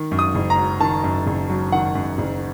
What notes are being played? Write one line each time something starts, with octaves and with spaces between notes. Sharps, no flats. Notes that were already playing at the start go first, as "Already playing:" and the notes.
Already playing: D#3
F#2
D#6
F#1
A#5
F#3
D#3 A5
F#2
F#1
F#3
D#3 F#5
F#2
F#1